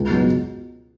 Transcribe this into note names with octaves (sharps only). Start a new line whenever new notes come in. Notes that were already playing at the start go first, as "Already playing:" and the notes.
Already playing: C#2
B2 F#3 B3